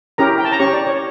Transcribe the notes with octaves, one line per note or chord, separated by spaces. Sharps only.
C#4 E4 G4 A#4 A#5
G5
A5
A#5
C#4 G4 C#5 C#6
D5
C#5